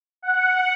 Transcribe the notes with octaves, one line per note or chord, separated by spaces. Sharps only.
F#5